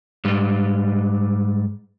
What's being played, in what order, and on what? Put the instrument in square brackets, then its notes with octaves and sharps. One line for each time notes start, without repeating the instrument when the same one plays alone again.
[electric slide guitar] G#2 G3